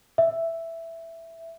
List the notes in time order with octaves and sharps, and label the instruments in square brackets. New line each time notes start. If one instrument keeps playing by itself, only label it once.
[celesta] E5